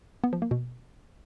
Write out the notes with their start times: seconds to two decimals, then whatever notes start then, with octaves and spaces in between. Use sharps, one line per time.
0.24 B3
0.33 F3
0.42 A#3
0.51 B2